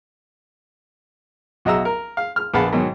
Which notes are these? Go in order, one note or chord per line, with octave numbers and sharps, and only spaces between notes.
B1 F#4 D#5 E5 A#5 E6
A#4
F5
F6
A#1 B3 F5 F#5 A5 B5
G#2 B2 D#3 F#3